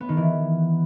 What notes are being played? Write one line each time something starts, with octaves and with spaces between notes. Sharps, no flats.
B3
D#3
E3